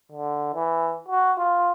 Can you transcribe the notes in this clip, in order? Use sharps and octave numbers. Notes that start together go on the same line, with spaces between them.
D3
E3
F#4
F4